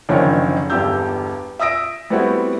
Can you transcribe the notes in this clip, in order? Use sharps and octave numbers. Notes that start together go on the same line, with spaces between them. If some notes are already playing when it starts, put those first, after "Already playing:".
F#1 D3 D#3 F3 C#5 D5
G1 E2 G2 G4 E6 G6
E5 D#6 E6 A#6 D7
G3 A3 B3 C4 E4 F#4